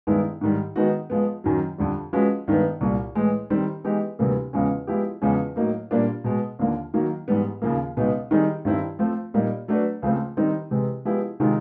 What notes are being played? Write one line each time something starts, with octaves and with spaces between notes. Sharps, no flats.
G2 D#3 G#3 B3 E4
G#2 D#3 G3
D#3 G#3 B3 D#4 F#4
F3 G#3 B3
F#2 D#3 F#3
F2 D3 G3
F3 G#3 C#4 F#4 B4
G2 D#3 G#3 B3
C2 A#2 G3
A2 E3 G#3
D#3 G3 C4
E3 G#3 B3 D#4 G4
D2 C3 E3 G3 A#3
E2 C#3 F3 G#3 C#4
F3 G#3 B3 E4 G4
E2 C#3 F3 G#3 C#4
A2 F#3 A#3 D#4
A#2 G3 A#3 D4 F4
B2 G#3 B3
D#2 D3 F3 A#3
D#3 F#3 A#3
G#2 E3 G3 B3
D#2 C#3 F3 A#3
C#2 B2 G#3 B3 D#4
D#3 G3 C4 D#4 G#4
G2 D#3 G3 C4 E4
F3 A3 C4
A#2 G3 A#3 D#4
F#3 A3 D4 F#4 B4
C#2 C#3 F3 A3 C4
D#3 G3 C4 D#4
C3 E3 G#3 C4
F3 G#3 B3 E4 G4
C3 D#3 G#3 C4 F4